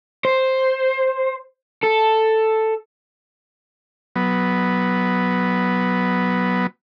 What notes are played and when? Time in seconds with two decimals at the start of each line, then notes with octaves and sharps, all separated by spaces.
0.25 C5
1.83 A4
4.16 F#3 B3